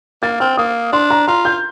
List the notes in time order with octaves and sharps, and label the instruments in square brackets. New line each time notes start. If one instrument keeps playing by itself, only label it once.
[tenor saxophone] A#3 [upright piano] A6
[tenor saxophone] C4 [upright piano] F6
[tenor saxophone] A#3 [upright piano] D#6
[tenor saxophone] D4 [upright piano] C6
[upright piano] A#5
[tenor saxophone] F4 [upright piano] A#5
[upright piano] G6